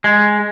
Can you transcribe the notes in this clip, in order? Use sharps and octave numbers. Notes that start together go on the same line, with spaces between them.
G#3